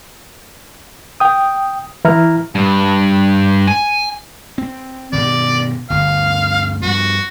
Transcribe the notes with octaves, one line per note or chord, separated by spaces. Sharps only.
G5 D#6
E3 E4 A#5 F6
G2
G#5
C4
G2 B2 D#3 D5
G1 D2 F5
G2 F3 F#4